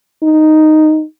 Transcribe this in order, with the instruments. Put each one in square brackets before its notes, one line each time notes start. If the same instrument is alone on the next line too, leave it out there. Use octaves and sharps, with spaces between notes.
[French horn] D#4